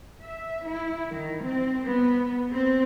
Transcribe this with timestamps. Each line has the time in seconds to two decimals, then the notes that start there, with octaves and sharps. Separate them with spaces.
0.21 E5
0.66 E4
1.09 D#3
1.42 C4
1.85 B3
2.51 C4